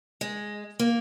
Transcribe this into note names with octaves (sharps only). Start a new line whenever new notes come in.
G#3
A#3